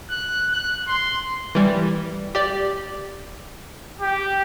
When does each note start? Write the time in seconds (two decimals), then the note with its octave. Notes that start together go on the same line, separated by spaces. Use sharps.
0.11 F#6
0.53 F#6
0.88 C6
1.55 E3 G3
2.35 G4 D5
4.01 G4